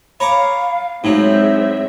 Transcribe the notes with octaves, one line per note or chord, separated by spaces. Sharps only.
C#5 F5 A#5 B5 D6
A2 F#3 G#3 C4 D#4 C5 E5